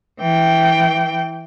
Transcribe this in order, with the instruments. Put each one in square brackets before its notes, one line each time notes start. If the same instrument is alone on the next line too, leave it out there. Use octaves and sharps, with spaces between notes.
[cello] E3 G5